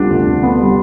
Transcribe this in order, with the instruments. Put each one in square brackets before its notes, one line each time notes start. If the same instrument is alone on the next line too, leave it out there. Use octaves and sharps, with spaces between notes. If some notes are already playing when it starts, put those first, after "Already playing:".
Already playing: [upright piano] D2 C3 G3 B3 [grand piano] D4 F4
[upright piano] D2
C3
B3
G3